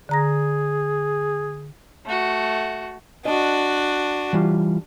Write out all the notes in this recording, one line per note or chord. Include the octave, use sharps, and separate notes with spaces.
D3 G#4 A#5 A#6
A3 F#4
D4 F#4 D#5
E3 G3 F4